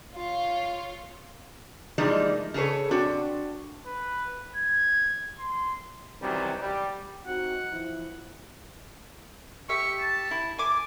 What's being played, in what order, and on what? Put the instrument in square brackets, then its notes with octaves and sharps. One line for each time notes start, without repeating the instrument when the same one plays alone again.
[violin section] F4 C#5
[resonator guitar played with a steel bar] E3 F3 G3 G#3 A#3 D#4
C#3 G#4 A4 B4 C#5
C4 D4 F#4
[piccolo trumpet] B4
G#6
C6
[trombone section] F#2 C3 D#3 E3 F#3 G3
G3
[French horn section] C4 D#4 F#4 [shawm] F#5
[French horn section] E3 F3 E4
[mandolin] G4 E5 [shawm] C#6
[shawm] A5
[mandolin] E4
G#5 D6